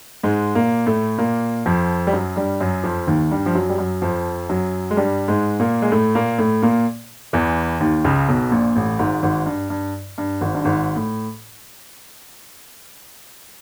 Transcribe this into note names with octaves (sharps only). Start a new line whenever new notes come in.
G#2 G#3
A#2 A#3
A2 A3
A#2 A#3
F2 F3
G3
F#2 F#3
G2 G3
F#2 F#3
F2 F3
D#2 D#3
G2 G3
F3
F#2 F#3
G3
F#2 F#3
F2 F3
F#2 F#3
G#3
G2 G3
G#2 G#3
A#2 A#3
G#3
A2 A3
A#2 A#3
A2 A3
A#2 A#3
E2 E3
D#2 D#3
C#2 C#3
B1 B2
A#1 A#2
A1 A2
G#1 G#2
G#1 G#2
G2
G2
G2
G#1 G#2
G2
G#1 G#2
A2